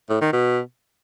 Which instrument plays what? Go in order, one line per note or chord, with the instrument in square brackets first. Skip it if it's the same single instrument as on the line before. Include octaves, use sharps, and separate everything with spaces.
[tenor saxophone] A2
D#3
B2